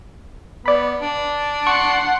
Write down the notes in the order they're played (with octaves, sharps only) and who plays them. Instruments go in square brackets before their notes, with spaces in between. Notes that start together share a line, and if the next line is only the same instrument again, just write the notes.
[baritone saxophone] B3 [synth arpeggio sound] D5 B5
[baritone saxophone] D4
[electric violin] F#5 C6 [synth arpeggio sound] C#6